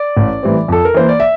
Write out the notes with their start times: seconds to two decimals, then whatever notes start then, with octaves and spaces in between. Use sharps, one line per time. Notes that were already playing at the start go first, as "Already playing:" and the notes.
Already playing: D5
0.17 A1
0.43 A2 E3 G3 C4
0.68 F2 A4
0.85 A#4
0.94 E3 A#3 C5
1.09 D5
1.20 E5